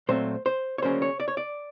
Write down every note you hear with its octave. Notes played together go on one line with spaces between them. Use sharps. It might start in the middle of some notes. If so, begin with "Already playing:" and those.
A#2 F#3 A3 C4 C5
C5
C#5
D2 C#3 F#3 A#3 C#4 C5
C#5
D5
C#5
D5